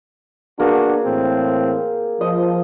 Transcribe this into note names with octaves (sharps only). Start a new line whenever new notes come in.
A#3 B3 D4 F#4 G#4
A2 E3 C4
F3 D#5